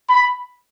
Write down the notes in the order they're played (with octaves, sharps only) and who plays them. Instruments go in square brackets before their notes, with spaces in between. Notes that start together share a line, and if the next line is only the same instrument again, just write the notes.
[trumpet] B5